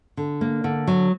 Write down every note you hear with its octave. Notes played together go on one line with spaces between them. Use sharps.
D3
A#3
D3
F#3